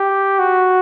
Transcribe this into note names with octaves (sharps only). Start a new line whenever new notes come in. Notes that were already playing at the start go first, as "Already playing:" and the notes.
Already playing: G4
F#4